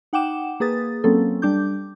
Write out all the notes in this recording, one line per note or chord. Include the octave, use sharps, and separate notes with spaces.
D#4 F#5 G5 D6 E7
A#3 G#4 B4 D#6 A6
F#3 A#3 C4 C#4 A4
G3 D4 D6 G6